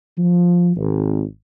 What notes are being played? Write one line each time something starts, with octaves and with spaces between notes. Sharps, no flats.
F3
G#1